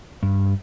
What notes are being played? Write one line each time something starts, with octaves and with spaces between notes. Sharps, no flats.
G2